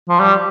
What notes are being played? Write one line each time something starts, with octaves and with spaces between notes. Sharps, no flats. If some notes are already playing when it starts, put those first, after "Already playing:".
F3
G3